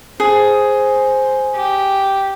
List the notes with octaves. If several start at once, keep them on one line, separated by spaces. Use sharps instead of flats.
G#4 C5
G4